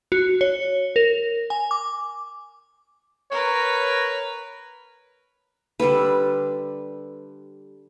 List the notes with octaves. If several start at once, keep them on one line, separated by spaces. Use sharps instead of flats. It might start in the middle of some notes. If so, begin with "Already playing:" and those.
F#4
C#5
A#4
G#5
D6
A#4 B4 C#5
D3 G3 A4 B4